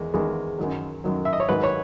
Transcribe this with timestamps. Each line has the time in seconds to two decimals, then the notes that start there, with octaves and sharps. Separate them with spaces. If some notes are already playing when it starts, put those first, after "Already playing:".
Already playing: E2 D#3 G#3
0.14 E2 D#3 G#3
0.59 F#2 D#3 F#3
1.04 F#2 D#3 F#3
1.25 E5
1.33 D#5
1.40 C#5
1.49 G#2 D#3 F#3 B4
1.63 C#5